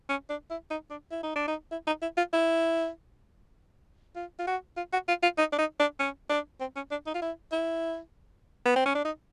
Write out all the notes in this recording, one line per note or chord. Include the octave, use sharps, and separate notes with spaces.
C#4
D4
E4
D#4
D4
E4
D#4
D4
D#4
E4
D#4
E4
F4
E4
F4
F4
F#4
F4
F#4
F4
F4
D#4
D4
D#4
D4
C#4
D4
C4
C#4
D4
D#4
F4
E4
E4
B3
C4
C#4
D4
D#4